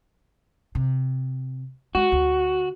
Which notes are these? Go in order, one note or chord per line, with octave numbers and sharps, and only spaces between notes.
C3
G#3 F#4
D2